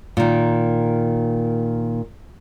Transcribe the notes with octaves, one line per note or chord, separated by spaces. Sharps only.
A#2 D#3